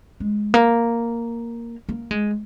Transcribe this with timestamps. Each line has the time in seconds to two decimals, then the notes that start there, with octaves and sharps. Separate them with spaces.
0.20 G#3
0.54 A#3
1.89 A#3
2.11 G#3